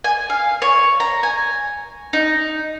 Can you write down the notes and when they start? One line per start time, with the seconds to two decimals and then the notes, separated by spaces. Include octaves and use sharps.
0.04 G#5
0.30 F5
0.62 C#5
1.00 A#5
1.23 G#5
2.13 D#4